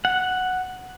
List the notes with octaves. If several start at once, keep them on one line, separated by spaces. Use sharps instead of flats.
F#5